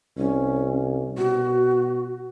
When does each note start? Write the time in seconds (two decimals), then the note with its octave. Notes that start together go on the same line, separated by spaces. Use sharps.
0.18 C2 C#4
1.18 B2 F#4